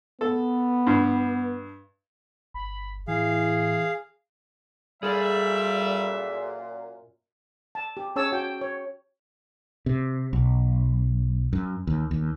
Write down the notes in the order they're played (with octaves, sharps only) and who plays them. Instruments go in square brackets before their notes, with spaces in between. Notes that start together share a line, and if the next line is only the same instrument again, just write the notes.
[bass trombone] B3 [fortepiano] A4
[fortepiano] G2
[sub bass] G1 [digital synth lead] B5
[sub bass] A2 [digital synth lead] E3 [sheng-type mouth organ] G#4 F5
[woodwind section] F#2 A#2 [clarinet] G3 [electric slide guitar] G#4 A4 [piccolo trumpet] E5
[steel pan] A5
G4
C#4 G#4 C#5 A5 E6
F#4 G5
C#5
[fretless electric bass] C3
B1
F#2
D#2
D#2